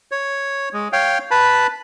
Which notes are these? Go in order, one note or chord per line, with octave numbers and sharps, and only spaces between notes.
C#5
G#3
C#5 F5 G5
B4 A5 B5